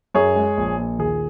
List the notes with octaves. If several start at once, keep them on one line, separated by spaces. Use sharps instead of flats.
F#2 G#4 C#5
G#3
A#1
A#2
D#2 G#4